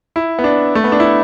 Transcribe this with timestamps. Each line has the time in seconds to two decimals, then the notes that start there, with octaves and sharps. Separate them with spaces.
0.16 E4
0.39 B3
0.44 D4
0.75 A3
0.84 B3
0.92 D4
1.00 E4